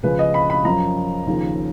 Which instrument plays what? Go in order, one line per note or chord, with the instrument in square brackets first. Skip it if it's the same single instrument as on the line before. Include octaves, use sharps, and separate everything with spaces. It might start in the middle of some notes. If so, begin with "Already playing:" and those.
[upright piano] C#2 C#3 F3 B4
D#5
B5
B5
F#2 F3 A#5
D#2 C#3 F3